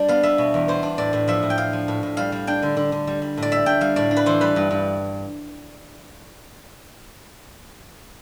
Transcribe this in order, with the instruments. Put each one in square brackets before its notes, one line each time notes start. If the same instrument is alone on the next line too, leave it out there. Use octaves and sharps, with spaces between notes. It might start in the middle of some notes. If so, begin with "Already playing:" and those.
Already playing: [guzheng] G3 D4 D5
B3 F5
B3 E5
B2
E2
B3 C5
D4
A2 D5
A2
F3 E5
A2
G5
D4 F5
F3
A2
A2
G3 F5
G3
D4 G5
D3
D3
D3
G3
G3
A2
D5
G3 E5
D4 G5
G3 F5
A2 D5
D4
B4
E3 C5
G3 B4
G2
G2